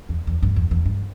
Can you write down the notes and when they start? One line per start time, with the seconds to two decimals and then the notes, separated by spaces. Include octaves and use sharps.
0.09 E2
0.27 E2
0.43 G2
0.56 E2
0.71 E2
0.86 G2